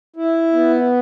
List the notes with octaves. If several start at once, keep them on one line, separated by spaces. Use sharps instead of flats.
E4
B3